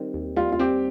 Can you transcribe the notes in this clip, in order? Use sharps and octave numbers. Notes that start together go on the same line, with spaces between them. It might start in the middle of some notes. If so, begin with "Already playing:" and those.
Already playing: D#3 G3 C4
D#2
G3 F4
F4
C4 G4